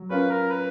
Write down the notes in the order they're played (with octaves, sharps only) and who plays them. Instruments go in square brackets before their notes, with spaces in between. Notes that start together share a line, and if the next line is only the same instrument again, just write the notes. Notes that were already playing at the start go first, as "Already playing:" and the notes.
Already playing: [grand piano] F#3
[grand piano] C#4 F4 A#4 C#5 [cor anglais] B4
[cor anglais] A#4
B4